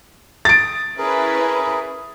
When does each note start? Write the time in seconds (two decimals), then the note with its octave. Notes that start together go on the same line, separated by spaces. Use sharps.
0.45 D#6 A6 D7
0.98 C#4 E4 G#4 A#4 B4